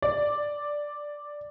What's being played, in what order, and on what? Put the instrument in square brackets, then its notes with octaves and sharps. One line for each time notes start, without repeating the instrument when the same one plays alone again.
[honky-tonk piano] D5